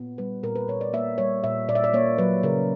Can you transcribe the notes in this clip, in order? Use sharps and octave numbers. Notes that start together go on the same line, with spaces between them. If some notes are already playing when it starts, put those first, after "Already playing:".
Already playing: A#2 B3
G3 B4
A#2 A#4
B4
A#2 C#5
D5
A#3 E5
G3 C#5
A#2 E5
A#2 D5
E5
D5
A#3 C#5
F#3 B4
C#3 A#4